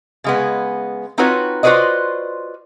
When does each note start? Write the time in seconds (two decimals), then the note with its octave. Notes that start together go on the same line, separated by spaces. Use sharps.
0.24 C#3 G#3 B3
1.18 C4 D#4 F4 F#4 B4 C#5
1.63 F4 F#4 B4 C5 D5 D#5